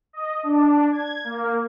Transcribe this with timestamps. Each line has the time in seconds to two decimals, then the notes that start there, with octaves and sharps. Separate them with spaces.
0.13 D#5
0.43 D4
0.92 G#6
1.24 A#3